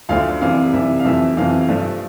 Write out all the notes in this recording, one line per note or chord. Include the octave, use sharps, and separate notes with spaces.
D2 D3 F3 A3 F5
C2 C3 E3 F5
C2 C3 E3 E5
F5
F2 C3 E3 A3 E5
F2 C3 E3 A3 F5
F5
G2 F3 A3 E5